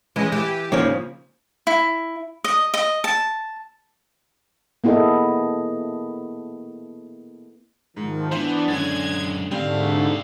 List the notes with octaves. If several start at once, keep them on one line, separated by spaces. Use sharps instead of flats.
E3 G#3 C#4 D#5
E3 G4
G#2 C#3 F3 A#3 C#5 D5
E4
D#5
D#5
A5
A#3 B3 E4 G#4 A4 D#5
G#2 D#3 F3
E3 B3 D4 C5
F#2 D3 G#3 C#4 G#6 A6
C2 G#2 D3 G3 A3 C4 F5